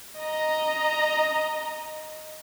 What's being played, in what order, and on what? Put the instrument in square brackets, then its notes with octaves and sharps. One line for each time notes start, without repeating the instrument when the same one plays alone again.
[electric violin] D#5 A#5